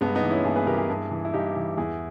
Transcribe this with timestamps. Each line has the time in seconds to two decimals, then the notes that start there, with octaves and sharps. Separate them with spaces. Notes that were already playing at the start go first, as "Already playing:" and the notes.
0.01 G2 G#3 B3
0.15 B3 D#4
0.24 E3
0.31 C#4 E4
0.44 G2 E4 G#4
0.56 G#4 B4
0.67 E3 G4 A#4
0.78 E4 G#4
0.90 G2
1.11 E3
1.25 E4
1.33 G2 D#4 G4
1.56 E3
1.77 E2 E4 G#4